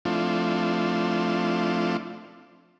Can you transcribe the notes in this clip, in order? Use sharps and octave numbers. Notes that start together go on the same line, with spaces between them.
F3 A3 C4 D4 E4 F4